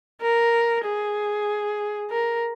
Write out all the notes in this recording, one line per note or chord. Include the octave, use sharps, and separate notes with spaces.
A#4
G#4
A#4